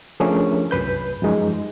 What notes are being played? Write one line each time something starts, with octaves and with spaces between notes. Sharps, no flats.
F3 A3 C#4 D4 G#4 A#4
C2 F#2 B4 G6
F#2 F3 G#3 D#4